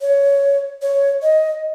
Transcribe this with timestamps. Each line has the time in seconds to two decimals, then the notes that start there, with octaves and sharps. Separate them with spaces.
0.01 C#5
0.82 C#5
1.22 D#5